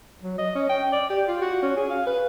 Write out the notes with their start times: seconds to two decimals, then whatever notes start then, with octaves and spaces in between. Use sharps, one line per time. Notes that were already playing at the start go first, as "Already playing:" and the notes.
0.22 F#3
0.38 D#5
0.55 C#4
0.69 G5
0.93 D5
1.10 G4
1.27 F4
1.42 F#4
1.63 C#4
1.76 G#4
1.90 F5
2.06 B4